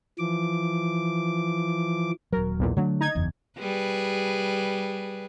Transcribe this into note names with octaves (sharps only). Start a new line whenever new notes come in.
E3 F3 D6
D#1 F#3 A#4
B1 E2 A#2
D3 F#3 A3 D4
D#4 G#6
F#1 E2
G3 G#4 B4